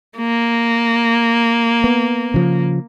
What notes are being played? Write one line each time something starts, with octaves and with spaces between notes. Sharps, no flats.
A#3
B3
C#3 F3